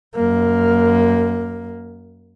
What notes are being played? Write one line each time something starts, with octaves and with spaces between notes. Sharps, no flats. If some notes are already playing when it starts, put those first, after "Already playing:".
F#2 A#3